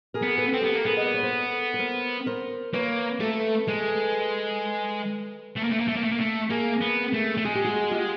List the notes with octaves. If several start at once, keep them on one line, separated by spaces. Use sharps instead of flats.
G#4 A#4
B3
A4 B4
C4
B3 G4 A4
A#3
B3 G#4 A#4
D#5
D5
C#5
C5
A4 B4
B4
A#4 C5
A#4 C5
A#3 B4 C#5
A3 A4 B4
G#3 A4 B4
A3
A#3
A3
A#3
A3
A#3
A3
A#3
A3
A#3 G#4 A#4
B3
A3
A3
G#3 G#4
G4
F#4 G#4
F4 G4